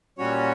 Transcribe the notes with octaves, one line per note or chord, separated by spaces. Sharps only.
A#2 G3 C#4 F#4 C#5